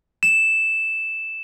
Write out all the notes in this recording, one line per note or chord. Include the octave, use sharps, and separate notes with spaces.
E7